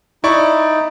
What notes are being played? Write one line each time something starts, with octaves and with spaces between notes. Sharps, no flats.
D#4 E4 D5 C#6